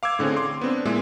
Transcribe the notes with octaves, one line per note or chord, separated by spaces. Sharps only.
F5 D6 E6 G#6
A2 D3 C4 C#4 G#4
C6 D6
B3 C4 D4
A#2 G#3 B3 E4